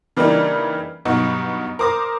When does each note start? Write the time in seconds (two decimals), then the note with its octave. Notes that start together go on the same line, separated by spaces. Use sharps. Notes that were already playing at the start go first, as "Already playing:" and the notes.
0.17 C#3 E3 G3 A#3 D4 D#4
1.05 G2 B2 F#3 D#4 F#4
1.79 A#4 C5 D6 D#6 A#6